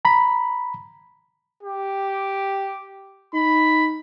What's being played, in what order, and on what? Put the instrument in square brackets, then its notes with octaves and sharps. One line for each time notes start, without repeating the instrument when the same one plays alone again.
[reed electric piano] A#5 B5
[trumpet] G4
[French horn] D#4 [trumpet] B5